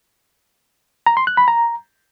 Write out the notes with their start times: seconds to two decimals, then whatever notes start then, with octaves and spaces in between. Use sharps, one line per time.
1.06 A#5
1.17 C6
1.27 F#6
1.37 B5
1.48 A#5